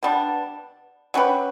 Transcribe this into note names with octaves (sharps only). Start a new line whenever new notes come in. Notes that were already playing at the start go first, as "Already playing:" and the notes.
B2 G3 B3 D4
F#3 C#4 G4 B4